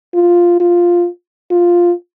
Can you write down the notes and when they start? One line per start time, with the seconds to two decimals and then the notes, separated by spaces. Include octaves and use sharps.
0.15 F4
0.60 F4
1.51 F4